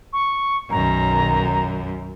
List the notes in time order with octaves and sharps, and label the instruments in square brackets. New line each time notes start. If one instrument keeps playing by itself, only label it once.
[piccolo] C#6
[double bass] B1 D#3 [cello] F#2 [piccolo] A#5